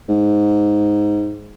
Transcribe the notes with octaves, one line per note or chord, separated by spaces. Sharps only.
G#2